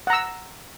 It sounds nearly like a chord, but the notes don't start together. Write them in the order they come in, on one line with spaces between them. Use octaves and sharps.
F#5 A#5 E6